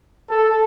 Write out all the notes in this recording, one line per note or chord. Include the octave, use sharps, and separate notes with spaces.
A4